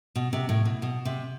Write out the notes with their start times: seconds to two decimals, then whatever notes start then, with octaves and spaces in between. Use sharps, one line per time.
0.16 B2
0.33 C3
0.49 A2
0.65 B2
0.82 B2
1.05 C3